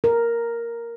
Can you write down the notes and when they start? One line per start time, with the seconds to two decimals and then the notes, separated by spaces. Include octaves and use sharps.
0.04 A#4